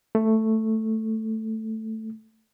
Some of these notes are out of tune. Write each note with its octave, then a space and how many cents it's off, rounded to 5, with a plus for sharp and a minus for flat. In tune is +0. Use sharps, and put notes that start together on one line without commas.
A3 +5